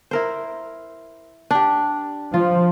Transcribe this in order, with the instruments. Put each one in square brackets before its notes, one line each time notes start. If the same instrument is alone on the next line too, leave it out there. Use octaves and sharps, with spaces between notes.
[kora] E4 A#4 C5
D4 G4
[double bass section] F3 [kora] F4